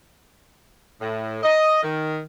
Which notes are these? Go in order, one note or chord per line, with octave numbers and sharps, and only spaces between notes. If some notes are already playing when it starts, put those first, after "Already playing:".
A2
D#5
D#3